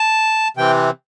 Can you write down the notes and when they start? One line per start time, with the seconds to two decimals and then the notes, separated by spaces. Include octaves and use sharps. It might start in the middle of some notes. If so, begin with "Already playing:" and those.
Already playing: A5
0.57 C3 E3 C4 G5